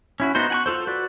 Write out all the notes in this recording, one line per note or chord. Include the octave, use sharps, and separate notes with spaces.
C#4 E4 F#4
B3 D#4 F#4 C5
F#5 G#5 C#6
F4 A4 C5
F#4 B4 D5